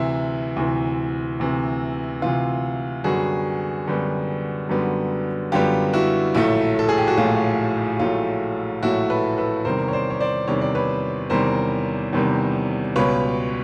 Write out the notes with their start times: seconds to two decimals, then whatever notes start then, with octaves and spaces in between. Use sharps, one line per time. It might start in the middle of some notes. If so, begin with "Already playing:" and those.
Already playing: D2 C3 E3 E4
0.56 D2 C3 E3
1.40 D2 C3 E3
2.22 D2 C3 E3 F4
3.04 F#2 D3 G3 B3 F#4 G#4
3.87 F#2 D3 G3 B3
4.69 F#2 D3 G3 B3
5.52 F#2 D3 G3 B3 F4 G4
5.93 E4 F#4
6.35 A#1 A2 F#3 A3 E4
6.79 A4
6.89 G#4
6.98 G4
7.08 F#4
7.17 A#1 A2 F#3 A3 F4
8.00 A#1 A2 F#3 A3 F4
8.83 A#1 A2 F#3 A3 E4 F#4
9.10 A4 B4
9.38 A4 B4
9.65 E2 C3 D#3 G3 A#4 C5
9.88 C#5
9.93 C5 D5
10.10 C#5
10.20 C5 D5
10.48 E2 C3 D#3 G3 C#5
10.62 D5
10.75 B4 C#5
11.30 E2 C3 D#3 G3 A#4 C5
12.13 E2 C3 D#3 G3
12.96 C#2 B2 G3 B4 C#5